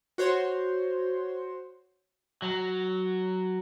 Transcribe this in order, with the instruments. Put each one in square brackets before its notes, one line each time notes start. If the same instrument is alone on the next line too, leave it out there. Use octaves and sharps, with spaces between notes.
[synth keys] F#4 C5 C#5 C6
[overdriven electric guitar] F#3